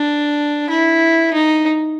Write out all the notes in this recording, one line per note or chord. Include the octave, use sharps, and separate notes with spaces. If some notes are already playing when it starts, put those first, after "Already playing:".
Already playing: D4
E4
D#4